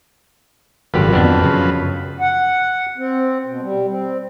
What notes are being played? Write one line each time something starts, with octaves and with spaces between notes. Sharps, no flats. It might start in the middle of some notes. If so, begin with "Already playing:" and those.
G#1 F#2 D3 F3 G4 B4
F2 B3 D4
C#3
F#5
C4
B2
G3
C4